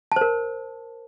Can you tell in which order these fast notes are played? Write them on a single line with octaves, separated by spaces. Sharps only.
A5 C5 A#4